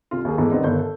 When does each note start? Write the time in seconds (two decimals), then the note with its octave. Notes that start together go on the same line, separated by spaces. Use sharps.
0.11 C2 F4
0.25 D#2 G#4
0.38 E2 G#2 A4
0.52 B2 D#3 G3 B3 C4 D#4
0.64 G1 D#3 A4 G6
0.79 A4